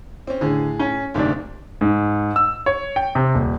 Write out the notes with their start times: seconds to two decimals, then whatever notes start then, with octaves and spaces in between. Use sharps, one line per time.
0.27 C4 C#4
0.41 A2 D3 G#4
0.79 C#4
1.14 F#1 D2 G#2 C3 D4
1.81 G#2
2.36 E6
2.66 C#5
2.96 G5
3.15 C3
3.35 D#1